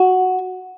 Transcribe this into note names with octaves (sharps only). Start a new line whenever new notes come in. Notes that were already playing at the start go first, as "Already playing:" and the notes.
Already playing: F#4